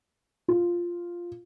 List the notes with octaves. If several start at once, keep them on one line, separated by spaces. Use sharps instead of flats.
F4